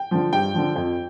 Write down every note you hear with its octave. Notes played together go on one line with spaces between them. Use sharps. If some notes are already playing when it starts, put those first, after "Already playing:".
Already playing: G5
D3 F3
G2 G5
D3 F3
F2